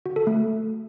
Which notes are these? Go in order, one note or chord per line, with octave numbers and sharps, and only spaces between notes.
F#4
A4
A3